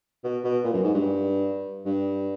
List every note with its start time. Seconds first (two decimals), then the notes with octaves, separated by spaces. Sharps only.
0.24 B2
0.44 B2
0.64 A#2
0.74 F#2
0.84 G#2
0.95 G2
1.86 G2